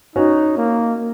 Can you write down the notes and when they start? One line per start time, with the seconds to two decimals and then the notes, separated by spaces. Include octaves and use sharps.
0.16 C#4 D#4 F#4
0.57 A#3